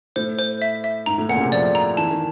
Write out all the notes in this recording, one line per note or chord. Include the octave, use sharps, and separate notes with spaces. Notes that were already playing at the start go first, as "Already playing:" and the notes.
A2 C5
C5
E5
E5
G#2 A#5
A2
A#2 F#5
C#3
C3
F3 D5
A#5
E3 A5
D#3